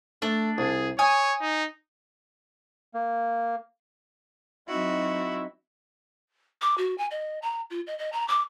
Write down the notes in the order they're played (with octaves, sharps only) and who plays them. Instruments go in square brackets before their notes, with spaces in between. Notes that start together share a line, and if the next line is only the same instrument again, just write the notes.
[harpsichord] A3 [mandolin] D4
[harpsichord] C2 [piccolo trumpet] G#4
[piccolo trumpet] C#5 [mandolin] G#5 [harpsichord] D#6
[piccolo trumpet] D#4
[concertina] A#3
[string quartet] F#3 F#4 [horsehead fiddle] C4 D#4 [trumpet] E4
[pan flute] D6
F#4
G#5
D#5
A#5
F4
D#5
D#5
A#5
D6